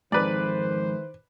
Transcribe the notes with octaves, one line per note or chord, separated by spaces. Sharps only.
F2 G#2 D#3 E3 B4 C5 D5